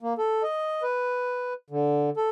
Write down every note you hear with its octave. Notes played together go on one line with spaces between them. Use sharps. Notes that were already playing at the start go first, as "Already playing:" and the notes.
A#3
A4
D#5
B4
D3
A4